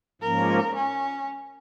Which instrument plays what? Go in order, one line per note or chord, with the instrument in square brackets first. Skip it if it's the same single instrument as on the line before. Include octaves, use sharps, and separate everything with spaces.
[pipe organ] G#2 F3 A#3 C#4 [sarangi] A#4
[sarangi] C#4